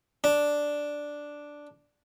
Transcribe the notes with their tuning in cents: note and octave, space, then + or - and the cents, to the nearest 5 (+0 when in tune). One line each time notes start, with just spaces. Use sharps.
D4 +0